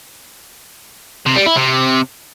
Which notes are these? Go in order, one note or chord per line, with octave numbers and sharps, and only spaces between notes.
C3
G3
E4
C3